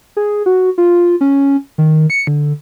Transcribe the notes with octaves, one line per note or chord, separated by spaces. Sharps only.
G#4
F#4
F4
C#4
D#3
C#7
D3